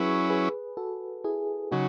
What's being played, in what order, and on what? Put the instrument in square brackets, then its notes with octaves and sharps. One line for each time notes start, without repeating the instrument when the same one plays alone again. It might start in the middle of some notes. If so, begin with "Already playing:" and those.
Already playing: [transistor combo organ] F#3 C#4 E4 [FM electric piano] G#4 B4
[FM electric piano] G#4 B4
F#4 A4
E4 G#4
[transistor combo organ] C#3 F#3 [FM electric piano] D#4 F#4